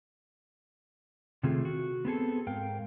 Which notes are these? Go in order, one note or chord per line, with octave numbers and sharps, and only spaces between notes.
C3 D#3 A3 C4 F4 G#4
F#4
B3 C4 G#4 A4
G#2 A#4 F5 G5